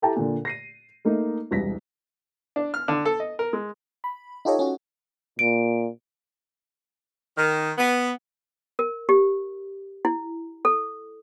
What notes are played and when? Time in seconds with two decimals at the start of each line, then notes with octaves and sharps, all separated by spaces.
0.02 E4 G4 A4 G5 A5 A#5
0.16 A#2 D3
0.45 A#6 C7 D#7
1.05 A3 A#3 D#4
1.51 E1 C2 A#6 B6
2.56 D4
2.74 F6
2.88 D3
3.05 A4
3.20 D#5
3.39 A#4
3.53 G#3
4.04 B5
4.45 D#4 F4 G4 A4 C#5 D#5
4.59 C#4 F#4
5.39 A#2 D7
7.37 D#3
7.78 B3
8.79 A#4
9.09 G4
10.05 E4
10.65 A4